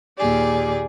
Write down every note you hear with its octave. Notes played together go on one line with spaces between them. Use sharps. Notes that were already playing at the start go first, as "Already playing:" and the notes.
D#2 A#2 G4 G#4 D5